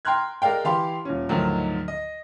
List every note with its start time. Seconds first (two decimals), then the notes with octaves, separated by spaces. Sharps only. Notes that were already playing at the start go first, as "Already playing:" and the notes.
0.05 G5 A#5 C6 F6 F#6 G#6
0.42 G#3 A#4 D5 F5 G5
0.64 E3 G4 F5 A5 C6
1.05 D#1 C#4
1.29 D2 G#2 D3 D#3 F3 F#3
1.88 D#5